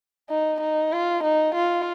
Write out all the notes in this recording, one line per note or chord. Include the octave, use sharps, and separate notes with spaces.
D#4
D#4
F4
D#4
F4